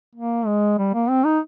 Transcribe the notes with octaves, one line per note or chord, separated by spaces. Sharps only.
A#3
G#3
G3
A#3
C4
D#4